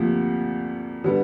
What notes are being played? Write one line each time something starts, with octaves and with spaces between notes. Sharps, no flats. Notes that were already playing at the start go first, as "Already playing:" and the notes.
Already playing: D2 C3 F3 A#3
D3 G3 B3